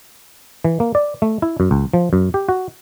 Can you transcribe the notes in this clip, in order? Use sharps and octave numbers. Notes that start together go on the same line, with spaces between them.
E3
A#3
D5
A3
E4
F#2
C#2
F3
F#2
G4
F#4